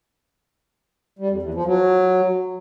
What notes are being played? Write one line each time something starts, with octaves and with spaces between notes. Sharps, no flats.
G3
F2
E2
F3
F#3